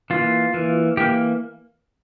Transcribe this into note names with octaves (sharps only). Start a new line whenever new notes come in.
E3 A#3 F4
E3 A#3
E3 A#3 G4